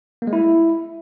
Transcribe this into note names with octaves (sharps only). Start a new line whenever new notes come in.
A#3
G#3
E4